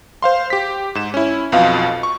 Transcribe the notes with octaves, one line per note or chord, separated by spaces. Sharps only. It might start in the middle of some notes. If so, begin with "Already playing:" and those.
C5 F5 C6
G4 B6
G#2 E7
C#4 E4
B1 F2 B2 F4 F5
C#6